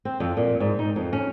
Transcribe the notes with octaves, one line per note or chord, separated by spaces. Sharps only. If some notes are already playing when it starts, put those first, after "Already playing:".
C4
F2
A#2
G#2
D#4
F2
C#4